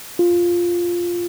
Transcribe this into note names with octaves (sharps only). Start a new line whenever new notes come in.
F4